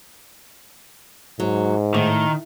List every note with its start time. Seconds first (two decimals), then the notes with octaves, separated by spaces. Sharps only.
1.40 G#2 F#3
1.94 A2 D#3